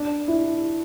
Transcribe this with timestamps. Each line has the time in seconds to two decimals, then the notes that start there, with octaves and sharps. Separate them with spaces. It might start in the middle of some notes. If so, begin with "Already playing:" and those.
Already playing: D4
0.28 E4